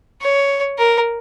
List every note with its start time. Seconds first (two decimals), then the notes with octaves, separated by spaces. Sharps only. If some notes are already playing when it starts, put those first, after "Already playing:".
0.21 C#5
0.78 A#4